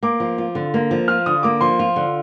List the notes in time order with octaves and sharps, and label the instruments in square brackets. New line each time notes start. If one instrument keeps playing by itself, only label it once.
[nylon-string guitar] A#3 [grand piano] D6
[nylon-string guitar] F3
F4
D3
A#3
F3
[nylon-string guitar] F4 [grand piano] F6
[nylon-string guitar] D3 [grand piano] D#6
[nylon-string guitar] A#3 [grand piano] D6
[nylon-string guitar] F3 [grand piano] C6
[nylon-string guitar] F4
D3